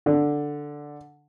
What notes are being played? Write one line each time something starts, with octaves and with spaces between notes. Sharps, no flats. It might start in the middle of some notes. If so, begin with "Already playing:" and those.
D3